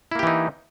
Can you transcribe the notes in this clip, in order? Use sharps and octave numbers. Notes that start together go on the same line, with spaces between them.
E3 A#3 D#4 E4 G4